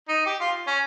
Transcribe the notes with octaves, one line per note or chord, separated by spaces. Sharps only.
D#4
G4
F4
C#4